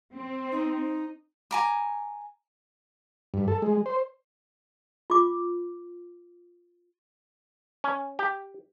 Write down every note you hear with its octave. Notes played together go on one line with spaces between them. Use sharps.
C4
D#4
G#5 A#5 D6
G2
A4
G#3
C5
F4 D6
C#4
G4